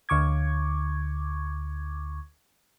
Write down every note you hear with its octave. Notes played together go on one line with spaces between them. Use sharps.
D2 D3 C#6 D6 G#6